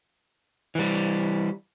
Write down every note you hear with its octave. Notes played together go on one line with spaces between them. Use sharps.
E3 G3